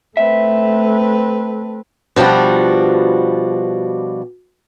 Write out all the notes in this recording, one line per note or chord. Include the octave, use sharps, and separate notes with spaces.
A3 C4 B4 E5
B2 F3 G3 D4 F#4